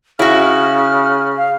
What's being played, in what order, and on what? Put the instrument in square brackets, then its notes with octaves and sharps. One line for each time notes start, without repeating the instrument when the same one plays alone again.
[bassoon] C#3 [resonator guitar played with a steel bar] E4 F#4 [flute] F6
[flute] F5